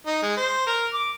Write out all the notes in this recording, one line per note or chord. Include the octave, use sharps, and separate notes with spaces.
D#4
G#3
C5
A#4
D6